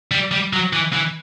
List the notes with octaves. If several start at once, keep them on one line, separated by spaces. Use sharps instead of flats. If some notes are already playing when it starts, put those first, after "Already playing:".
G3
G3
F#3
E3
E3